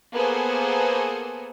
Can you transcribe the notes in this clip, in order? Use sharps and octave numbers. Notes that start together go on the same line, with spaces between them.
A#3 B3 G#4 A4 C5